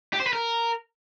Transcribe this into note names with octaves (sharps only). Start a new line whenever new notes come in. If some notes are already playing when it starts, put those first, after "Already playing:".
G4
C5
B4
A#4